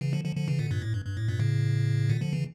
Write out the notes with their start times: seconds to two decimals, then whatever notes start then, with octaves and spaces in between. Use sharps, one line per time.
0.01 C#3 E3
0.13 D3 F3
0.24 D3 F3
0.36 D3 F3
0.48 C#3 E3
0.59 A#2 D3
0.71 G2 A#2
0.82 A2
0.94 G2
1.06 G2
1.17 A2
1.28 G2 A#2
1.39 A2 C#3
2.09 A#2 D3
2.21 D3 F3
2.33 C#3 E3